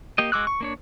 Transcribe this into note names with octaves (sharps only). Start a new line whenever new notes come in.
A#3 G4 D#5
G#3 F#4 D6 E6 F#6
C#6
A#3 D4 C#5